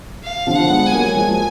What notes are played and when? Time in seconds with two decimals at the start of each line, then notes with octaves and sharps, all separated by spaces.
0.23 F5
0.47 D3 F3
0.55 F#5
0.65 D4
0.70 G#3 B3
0.86 G#5
0.93 F#3 A#3
1.16 F3 G#3 G#5